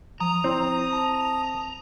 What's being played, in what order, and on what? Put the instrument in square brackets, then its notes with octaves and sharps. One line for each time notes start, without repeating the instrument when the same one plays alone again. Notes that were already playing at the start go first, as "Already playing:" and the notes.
[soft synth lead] F3 [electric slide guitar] A#5 [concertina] D#6
[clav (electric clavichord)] C4 [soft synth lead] E4
[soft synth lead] A5